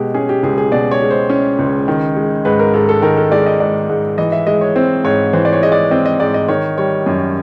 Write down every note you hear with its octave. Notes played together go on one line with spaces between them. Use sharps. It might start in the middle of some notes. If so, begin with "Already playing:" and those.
Already playing: B2 G#3 G4
C#4 G#4
G4
C#2 G#4
G#4
B2 D5
C#5
G#3
C5
C#4
C#2
D#3
G#3
G#2 B4
A#4
G#2 A4
A4
D#3 A#4
A4
G#3 D5
D#5
G#2 D5
G#2
E3 D#5
E5
G#3 D#5
C#5
C4 C5
G#2 C#5
E3 C5
D5
C#5
G#3 D#5
D5
C4 D#5
D#5
G#2 D5
D#5
D#3 C#5
G3 C#5
F#2